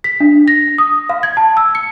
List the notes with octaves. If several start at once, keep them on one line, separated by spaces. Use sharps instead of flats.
B6
D4
A#6
D#6
F5
G#6
A5
E6
C#7